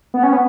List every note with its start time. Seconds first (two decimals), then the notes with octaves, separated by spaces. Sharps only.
0.14 B3
0.23 C#4
0.33 B3